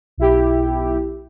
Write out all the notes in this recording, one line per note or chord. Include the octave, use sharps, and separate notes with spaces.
B1 E4 G4